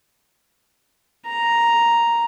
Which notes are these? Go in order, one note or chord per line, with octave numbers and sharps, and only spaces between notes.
A#5